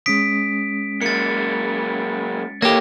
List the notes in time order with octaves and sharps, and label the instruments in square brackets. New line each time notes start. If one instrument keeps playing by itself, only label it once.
[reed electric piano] G#3 C#4 D#6 [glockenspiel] B6 D7
[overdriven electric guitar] F#3 A#3 [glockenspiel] A6 C#7
[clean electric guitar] A#3 G4 [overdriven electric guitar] A4 C#5 [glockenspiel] A#6